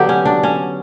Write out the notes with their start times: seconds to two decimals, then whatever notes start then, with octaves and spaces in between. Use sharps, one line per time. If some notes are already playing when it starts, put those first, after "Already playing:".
Already playing: D3 F#3 B3 G4
0.09 C#4
0.25 D4
0.43 C#4